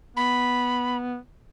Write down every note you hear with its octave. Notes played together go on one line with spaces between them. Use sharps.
B3 B5